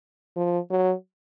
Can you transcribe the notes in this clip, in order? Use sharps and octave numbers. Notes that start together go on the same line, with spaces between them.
F3
F#3